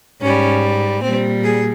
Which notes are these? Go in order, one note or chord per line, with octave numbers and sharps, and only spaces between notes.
G#2 G3 C#4
A#2 G3 C4
G#4